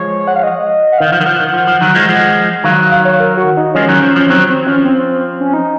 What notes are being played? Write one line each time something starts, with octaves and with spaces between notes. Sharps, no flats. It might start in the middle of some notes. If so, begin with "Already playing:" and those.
Already playing: F3 G#3 C#5
F#5
F5
D#5
F#5
D#3 F5
F3
D#3 F#5
F3
D#3 F#5
F3
F3
D#3 F#3
F3 G#3
F3 G#3
D#3 F#3 F5
F5
C#5
A#4
F#4
D#4
F3 G#3 C#4
D#3 F#3
F3
F3 C#4
D#3 F#3 C4
C4
F3 C#4
C4
C#4
D#4